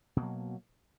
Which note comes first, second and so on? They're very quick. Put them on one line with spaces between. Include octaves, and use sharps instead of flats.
B2 A#3 F#3